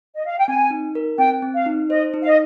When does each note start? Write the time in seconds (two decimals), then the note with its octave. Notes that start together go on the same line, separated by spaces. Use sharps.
0.14 D#5
0.25 F5
0.37 G5
0.48 C4 G#5
0.71 D#4
0.95 A#4
1.18 C4 G5
1.42 C4
1.54 F5
1.66 D#4
1.90 C5 D#5
2.14 D#4
2.22 F5
2.26 D#5